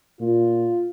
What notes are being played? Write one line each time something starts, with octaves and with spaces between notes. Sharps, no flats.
A#2 F4